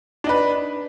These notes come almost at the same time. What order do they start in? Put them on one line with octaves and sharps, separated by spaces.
D4 D#4 B4